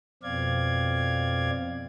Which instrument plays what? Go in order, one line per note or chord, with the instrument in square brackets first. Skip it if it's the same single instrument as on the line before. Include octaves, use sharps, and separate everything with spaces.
[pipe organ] F2 B2 C4 D5 F5 G#6